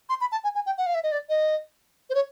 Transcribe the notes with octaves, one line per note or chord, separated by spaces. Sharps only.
C6
B5
A5
G#5
G#5
G5
F#5
F5
E5
D#5
D5
D#5
C5
C#5